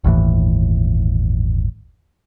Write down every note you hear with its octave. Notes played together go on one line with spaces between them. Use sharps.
G1 D#2 A2 E3